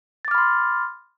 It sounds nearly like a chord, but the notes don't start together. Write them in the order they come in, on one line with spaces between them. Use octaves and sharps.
A6 D6 F6 B5 C6